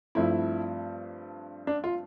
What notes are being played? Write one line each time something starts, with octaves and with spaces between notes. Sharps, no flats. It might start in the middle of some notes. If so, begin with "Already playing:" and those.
G2 F3 A3 C4 E4
D4
F4